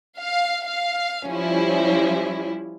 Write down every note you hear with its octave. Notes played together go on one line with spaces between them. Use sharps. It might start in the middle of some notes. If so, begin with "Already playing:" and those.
F5
F5
F3 G3 C#4 E4